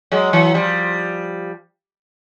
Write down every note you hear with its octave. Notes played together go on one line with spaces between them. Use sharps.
F#3 G#3
E3 F#3
F3 G3